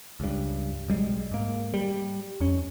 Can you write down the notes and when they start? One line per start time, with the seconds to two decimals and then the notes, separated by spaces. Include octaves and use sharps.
0.20 C#2 G2
0.88 B1 G3 G#3
1.32 G#2 A#3
1.74 G3
2.40 F2 C#4